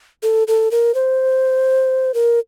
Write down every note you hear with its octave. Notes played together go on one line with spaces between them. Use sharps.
A4
A4
A#4
C5
A#4